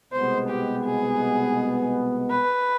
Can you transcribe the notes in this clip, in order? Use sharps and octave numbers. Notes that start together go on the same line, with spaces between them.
C2 B2 G#3 B3 C5
G4
G#4
B4